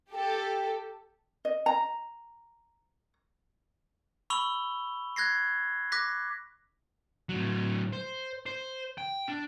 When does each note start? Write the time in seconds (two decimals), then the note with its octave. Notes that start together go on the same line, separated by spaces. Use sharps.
0.11 G4 A4
1.45 D#5
1.66 A#5
4.30 B5 C#6 E6 F7 G7
5.16 F#6 G#6 A#6 C7
5.92 D6 F#6 A#6 B6
7.29 A2 F#3
7.93 C5
8.46 C5
8.98 G5
9.29 D4